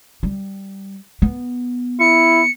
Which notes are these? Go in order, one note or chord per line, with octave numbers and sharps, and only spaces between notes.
G3
B3
E4 C#7